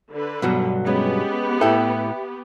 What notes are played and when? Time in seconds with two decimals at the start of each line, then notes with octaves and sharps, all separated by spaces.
0.11 D3 B4
0.42 G2 B2 F#3
0.86 G#3 B3 C#4 G4
1.61 A2 E4 A4 E5 G5